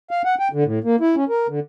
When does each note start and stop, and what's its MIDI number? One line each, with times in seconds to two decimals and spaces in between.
0.11 0.22 77
0.25 0.35 78
0.39 0.48 79
0.53 0.64 50
0.65 0.79 45
0.84 0.96 58
1.01 1.15 64
1.16 1.24 61
1.29 1.47 70
1.49 1.60 50